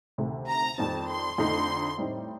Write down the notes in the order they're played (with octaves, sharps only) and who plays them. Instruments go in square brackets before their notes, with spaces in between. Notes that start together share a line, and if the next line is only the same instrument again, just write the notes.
[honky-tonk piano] D2 C3 D#3 A3
[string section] A#5
[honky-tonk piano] F2 D#3 G3 C4 D#4 [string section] A5
[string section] C6
[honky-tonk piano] F2 D3 A3 D#4 [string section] C6
[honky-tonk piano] A2 G3 C4 D#4